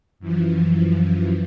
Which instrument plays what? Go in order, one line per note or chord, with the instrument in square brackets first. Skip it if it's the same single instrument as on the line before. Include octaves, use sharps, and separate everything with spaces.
[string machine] F#2 E3 F3